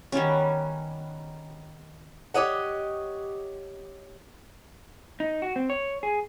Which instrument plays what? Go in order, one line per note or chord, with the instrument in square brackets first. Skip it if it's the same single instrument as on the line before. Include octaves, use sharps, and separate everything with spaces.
[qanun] D#3 G3 B3 C#4
[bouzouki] G4 C#5 D#5 F#5
[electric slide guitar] D#4
F#4
C4
C#5
G#4